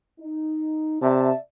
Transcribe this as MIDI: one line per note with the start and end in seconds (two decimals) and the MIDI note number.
0.20 1.01 63
1.02 1.31 48
1.02 1.36 74
1.02 1.36 76
1.02 1.36 81